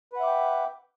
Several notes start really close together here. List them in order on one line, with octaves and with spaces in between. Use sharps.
B4 F#5 E5 D6 G5